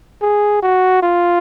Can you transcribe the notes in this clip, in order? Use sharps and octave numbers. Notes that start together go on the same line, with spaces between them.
G#4
F#4
F4